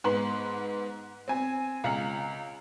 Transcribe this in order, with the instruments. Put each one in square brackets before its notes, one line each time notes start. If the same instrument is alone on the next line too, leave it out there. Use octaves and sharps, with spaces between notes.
[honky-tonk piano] G#2 B3 B4 C6 F#7
C4 G#5
C#2 F5 A#5 C#7 F#7